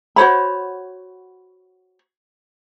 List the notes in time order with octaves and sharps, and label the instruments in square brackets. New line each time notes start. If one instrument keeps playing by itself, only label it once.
[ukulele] F#4 C5 C#5 B5